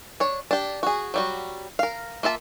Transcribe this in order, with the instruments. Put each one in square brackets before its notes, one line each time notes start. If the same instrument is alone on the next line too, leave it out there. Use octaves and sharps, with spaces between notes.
[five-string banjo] D4 C#5
D4 G4
F#4 G#4
F#3 G3 F#4
A#4 F5
A#3 F4 E5 A5